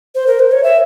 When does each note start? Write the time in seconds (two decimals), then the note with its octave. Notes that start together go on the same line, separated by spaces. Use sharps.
0.15 C5
0.27 A#4
0.39 C5
0.52 C#5
0.63 E5